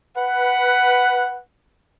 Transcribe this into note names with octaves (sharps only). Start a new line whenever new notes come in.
B4 F#5